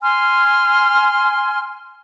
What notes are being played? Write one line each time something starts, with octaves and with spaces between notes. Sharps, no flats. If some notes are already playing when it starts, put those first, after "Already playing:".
G#5 C6 F6